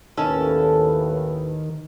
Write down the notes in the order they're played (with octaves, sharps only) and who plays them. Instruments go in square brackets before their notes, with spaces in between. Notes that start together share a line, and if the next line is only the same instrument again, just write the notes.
[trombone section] D#2 A2 B4 [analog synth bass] D#3 [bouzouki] C#4 E4 A4